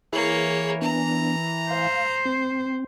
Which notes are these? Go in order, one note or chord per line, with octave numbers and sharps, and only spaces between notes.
E3 A#3 G#4 C#5
B3 D4 A#5
C5 F5
C4